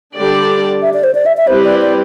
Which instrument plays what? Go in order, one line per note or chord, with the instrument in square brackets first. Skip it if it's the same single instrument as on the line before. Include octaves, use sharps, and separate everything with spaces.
[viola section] D3 G3 D4 G4 D5
[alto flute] E5
D5
C5
D5
E5
E5
[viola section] G3 C4 E4 G4 B4 [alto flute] C5
[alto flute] D5
D5